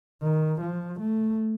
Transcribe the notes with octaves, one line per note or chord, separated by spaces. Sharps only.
D#3
F3
A3